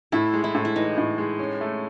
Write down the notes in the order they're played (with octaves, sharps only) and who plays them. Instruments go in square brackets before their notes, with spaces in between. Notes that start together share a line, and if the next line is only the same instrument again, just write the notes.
[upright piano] A2 [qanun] E4
[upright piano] G#3
[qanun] E4
[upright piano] A2
[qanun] E4
[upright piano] E3 [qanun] D#4
[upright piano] A2
G#3
C#4
A3